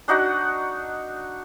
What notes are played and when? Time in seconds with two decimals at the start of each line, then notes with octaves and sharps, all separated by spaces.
0.08 D4 D#4 F#4 F#5